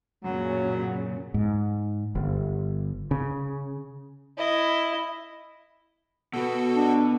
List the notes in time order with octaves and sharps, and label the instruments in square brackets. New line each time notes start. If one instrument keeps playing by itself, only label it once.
[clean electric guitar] F#2 [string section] A#2 C#3 [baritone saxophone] F#3
[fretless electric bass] G#2
G1
C#3
[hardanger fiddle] E4 D#5
[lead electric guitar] B2 B3 [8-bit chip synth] F#4 A4
[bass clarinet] D4